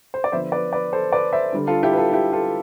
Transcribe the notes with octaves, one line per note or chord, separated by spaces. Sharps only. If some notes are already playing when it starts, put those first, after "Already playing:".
C5
D5
D3 F3 B3 D4 C5 E5
B4 D5
B4 D5
A4 C5
B4 D5
C5 E5
D3 G3 D4
F4 A4
E4 G4
B4
F4 A4
E4 G4
F4 A4